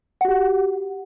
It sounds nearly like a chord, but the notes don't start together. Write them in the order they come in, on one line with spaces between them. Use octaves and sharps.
F#5 F#4 G4